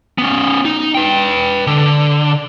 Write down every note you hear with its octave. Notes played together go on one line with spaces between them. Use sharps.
B3 C#4
D#4
B4 G5
D3